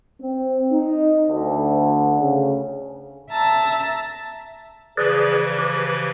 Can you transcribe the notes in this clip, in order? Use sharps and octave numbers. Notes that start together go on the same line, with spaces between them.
C4
D#4
D2
C#3
E5 A5 A#5 E6
C#3 E3 F3 G#4 B4 D5
G4 B4